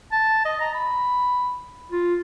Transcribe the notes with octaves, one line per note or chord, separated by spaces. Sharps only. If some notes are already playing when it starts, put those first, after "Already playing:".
A5
D#5
A#5
B5
F4